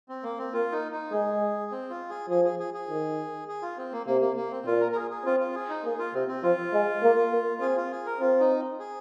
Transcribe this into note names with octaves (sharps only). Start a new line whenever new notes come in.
C4
A#3
C4
A#3 F4
D#4
D#4
G#3 G#4
C4
F4
G#4
F3 G#4
G#4
G#4
G#4
D#3
G#4
F4
C4
A#3
C3 A#3
A#3
A#3
C4
A#2 F4
A#4
A#4
G#4
G#4
C4 F4
F4
G#4
D#4
A#3 G#4
F4
C3 C4
C4
F3 F4
G#3
A#3
A#3
C4 G#4
F4
G#4
A#4
C4 F4
D#4
G#4